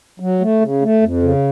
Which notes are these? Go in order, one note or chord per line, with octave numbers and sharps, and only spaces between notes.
F#3
A3
C#3
A3
F2
C#3